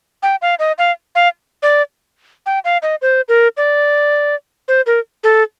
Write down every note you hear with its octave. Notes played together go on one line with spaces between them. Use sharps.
G5
F5
D#5
F5
F5
D5
G5
F5
D#5
C5
A#4
D5
C5
A#4
A4